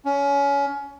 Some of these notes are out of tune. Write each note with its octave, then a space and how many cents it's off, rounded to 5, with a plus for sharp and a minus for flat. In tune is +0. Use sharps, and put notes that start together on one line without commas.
C#4 +25